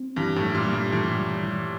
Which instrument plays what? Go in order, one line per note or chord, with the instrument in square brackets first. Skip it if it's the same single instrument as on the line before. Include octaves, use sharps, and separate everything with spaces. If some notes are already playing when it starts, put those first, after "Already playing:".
Already playing: [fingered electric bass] C4
[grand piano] G2 [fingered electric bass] E3
[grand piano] A2
[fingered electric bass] G3
[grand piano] A#2
[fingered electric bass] G3
[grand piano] G2
[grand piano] A2 [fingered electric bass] E3
[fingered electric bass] G3
E3